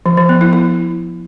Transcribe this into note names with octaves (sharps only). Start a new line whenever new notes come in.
F3
F3
B3
E4
E4